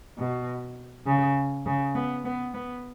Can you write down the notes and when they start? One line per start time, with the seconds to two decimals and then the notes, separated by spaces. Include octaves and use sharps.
0.19 B2
1.06 C#3
1.66 C#3
1.95 B3
2.25 B3
2.54 B3